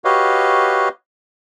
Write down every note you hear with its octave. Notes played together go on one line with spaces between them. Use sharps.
F#4 G4 B4 C#5 D#5 F5